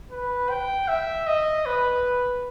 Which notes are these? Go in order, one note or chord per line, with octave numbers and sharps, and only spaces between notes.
B4
G5
E5
D#5
B4